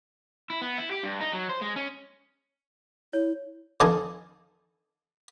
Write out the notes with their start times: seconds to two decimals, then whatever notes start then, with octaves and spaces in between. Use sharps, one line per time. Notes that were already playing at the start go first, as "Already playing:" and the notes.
0.50 E4
0.62 B3
0.78 E4
0.91 G4
1.03 G2
1.20 D#4
1.32 F#3
1.49 C5
1.61 G#3
1.76 C#4
3.13 E4 C#5
3.80 F2 D#3 D4 D#4 G#5 A5